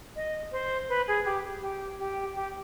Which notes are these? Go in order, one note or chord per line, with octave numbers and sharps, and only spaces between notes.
D#5
C5
B4
G#4
G4
G4
G4
G4